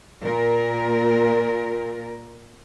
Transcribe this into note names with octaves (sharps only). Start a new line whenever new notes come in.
A#2 A#3 A#4